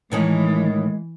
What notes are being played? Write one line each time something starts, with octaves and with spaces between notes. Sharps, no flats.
A2 D#3 E3 G#3 C#4